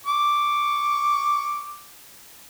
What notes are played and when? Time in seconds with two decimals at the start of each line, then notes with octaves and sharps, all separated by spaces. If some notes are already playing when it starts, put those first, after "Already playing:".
0.06 C#6 D6